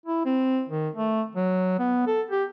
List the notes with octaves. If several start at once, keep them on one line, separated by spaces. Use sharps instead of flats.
E4
C4
D#3
A3
F#3
B3
A4
G4